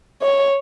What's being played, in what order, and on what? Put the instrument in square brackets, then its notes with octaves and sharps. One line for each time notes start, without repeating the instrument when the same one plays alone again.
[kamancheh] C#5